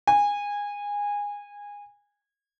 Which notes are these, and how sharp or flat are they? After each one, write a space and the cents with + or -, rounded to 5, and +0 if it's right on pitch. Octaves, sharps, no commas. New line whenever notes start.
G#5 -20